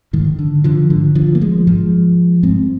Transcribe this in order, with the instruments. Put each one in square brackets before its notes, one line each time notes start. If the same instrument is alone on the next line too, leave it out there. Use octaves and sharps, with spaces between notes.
[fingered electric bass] G#2 D#3
D3
D3 F3
G#2 D3
D3 F3
A#3
F3 G#3
G#2 F3 G#3
G#2 G#3 C4